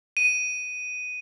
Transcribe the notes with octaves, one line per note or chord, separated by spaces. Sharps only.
D#7